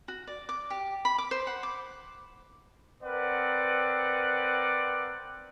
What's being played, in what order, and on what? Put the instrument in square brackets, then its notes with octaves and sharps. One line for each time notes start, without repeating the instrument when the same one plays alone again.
[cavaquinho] F#4
D5
D6
G4
B5
D6
C5
F#5
D6
[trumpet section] C4 A#4 B4 D5 F#5